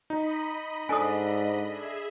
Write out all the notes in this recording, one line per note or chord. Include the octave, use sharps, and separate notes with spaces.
D#4 D#5 B5
G#2 D4 A4 G#5 D#6
G#4 E5